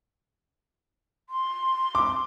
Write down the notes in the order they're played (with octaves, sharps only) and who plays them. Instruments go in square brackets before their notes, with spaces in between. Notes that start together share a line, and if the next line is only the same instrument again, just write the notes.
[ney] C6
[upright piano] D6